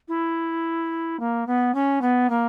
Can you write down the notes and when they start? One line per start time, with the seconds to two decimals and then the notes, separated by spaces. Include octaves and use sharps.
0.08 E4
1.20 A#3
1.47 B3
1.74 C#4
2.02 B3
2.30 A#3